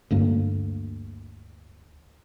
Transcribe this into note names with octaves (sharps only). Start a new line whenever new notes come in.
D2 G2 A#3